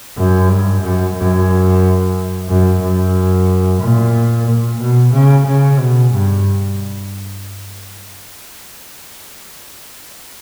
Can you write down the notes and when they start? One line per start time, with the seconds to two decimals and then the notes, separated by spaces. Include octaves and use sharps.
0.17 F#2
0.49 G2
0.82 F#2
1.15 F#2
2.47 F#2
2.81 F#2
3.81 A#2
4.47 A#2
4.81 B2
5.13 C#3
5.46 C#3
5.79 B2
6.13 G2